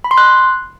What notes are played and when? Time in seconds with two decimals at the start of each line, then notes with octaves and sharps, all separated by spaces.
0.04 B5
0.11 C6
0.18 F#6